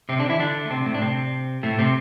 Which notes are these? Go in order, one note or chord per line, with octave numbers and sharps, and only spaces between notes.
C3 C4
D3 D4
E3 E4
D3 D4
A3
C3 C4
A2 A3
D4
C3 C4
A2 A3
C3 C4